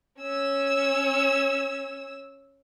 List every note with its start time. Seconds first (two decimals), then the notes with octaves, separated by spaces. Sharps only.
0.20 C#4 E6